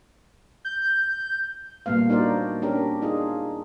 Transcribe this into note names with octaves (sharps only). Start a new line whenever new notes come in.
G6
A#2 G3 A#3 B3 F5
D4 D#4 F#4 A#4 C5 D5
C#4 D4 G4 A#4
D4 D#4 F4 G#4